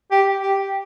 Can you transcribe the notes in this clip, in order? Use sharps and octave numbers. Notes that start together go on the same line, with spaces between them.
G4
G4